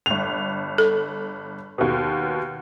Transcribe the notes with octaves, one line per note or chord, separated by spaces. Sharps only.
G1 F7
A4
D#2 B2